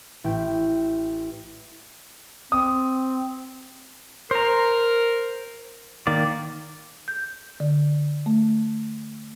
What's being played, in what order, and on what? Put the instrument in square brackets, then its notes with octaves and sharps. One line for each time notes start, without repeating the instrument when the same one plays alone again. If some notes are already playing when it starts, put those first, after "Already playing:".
[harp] A1 E4 G5
[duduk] C4 [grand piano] D#6
[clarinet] A#4 [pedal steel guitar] C5 A#5
[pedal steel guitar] D#3 A#3 D5
[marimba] G6
D3
A3